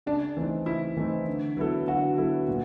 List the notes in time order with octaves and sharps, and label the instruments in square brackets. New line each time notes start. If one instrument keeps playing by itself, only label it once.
[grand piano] C#3 [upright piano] D4
[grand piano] E3 A3 C4 D#4
[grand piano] C#3 [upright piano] E4
[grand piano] E3 A3 C4 D#4
D3
F#3 B3 E4 A4
[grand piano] D3 [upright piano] F#4
[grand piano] F#3 B3 E4 A4
A#2